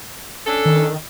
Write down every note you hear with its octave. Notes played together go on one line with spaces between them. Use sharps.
C#4 D4 A4
D#3